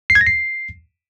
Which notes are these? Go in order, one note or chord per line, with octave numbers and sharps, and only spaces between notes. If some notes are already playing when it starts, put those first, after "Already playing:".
C7
G#6
A#6
C7